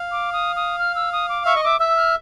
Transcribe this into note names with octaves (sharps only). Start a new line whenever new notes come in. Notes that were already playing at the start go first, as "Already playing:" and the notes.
Already playing: F5
D6
D#6
D#6
F6
E6
D#6
D6
E5 C#6
D#5
E5 D6
E5 E6
F6